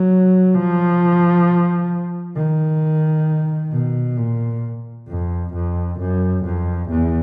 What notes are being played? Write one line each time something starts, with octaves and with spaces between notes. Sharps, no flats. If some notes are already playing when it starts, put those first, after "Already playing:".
Already playing: F#3
F3
D#3
B2
A#2
F2
F2
F#2
F2
E2